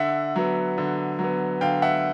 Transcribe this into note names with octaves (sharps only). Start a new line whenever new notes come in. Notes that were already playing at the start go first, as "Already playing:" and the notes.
Already playing: D3 E5 F#5
F#3 B3
D3
F#3
B3
D3 F5 G5
E5 F#5